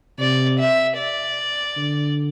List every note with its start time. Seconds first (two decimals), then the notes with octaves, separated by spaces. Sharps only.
0.19 C3 D5
0.59 E5
0.97 D5
1.77 D3